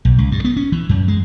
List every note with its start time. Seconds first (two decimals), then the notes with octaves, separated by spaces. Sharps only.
0.05 B1
0.18 C#2
0.32 G2
0.45 B3
0.57 C#4
0.72 E3
0.89 F#2
1.08 G#3